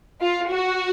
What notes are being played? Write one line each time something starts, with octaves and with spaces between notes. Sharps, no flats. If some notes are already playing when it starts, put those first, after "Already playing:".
F4
F#4